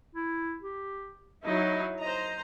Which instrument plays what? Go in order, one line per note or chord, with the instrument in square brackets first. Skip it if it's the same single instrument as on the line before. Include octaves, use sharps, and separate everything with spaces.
[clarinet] E4
G4
[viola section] F#3 D#4 E4 [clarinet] D#5
[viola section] C5 A#5 [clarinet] D#5